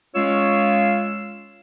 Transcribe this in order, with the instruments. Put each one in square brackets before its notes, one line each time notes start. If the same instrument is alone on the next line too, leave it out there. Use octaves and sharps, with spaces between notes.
[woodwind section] G#3 C#4 F4 C#5 F5 E6